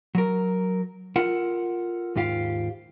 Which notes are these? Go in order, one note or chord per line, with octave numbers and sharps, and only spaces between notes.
F#3 A#4
F4 A4 A#4 F#5
D#2 G#2 F4 G4 F5